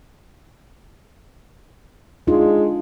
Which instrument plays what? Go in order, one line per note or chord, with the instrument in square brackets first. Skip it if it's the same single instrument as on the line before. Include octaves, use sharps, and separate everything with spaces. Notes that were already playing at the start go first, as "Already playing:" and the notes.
[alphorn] G#3 [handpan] D4 D#4 F4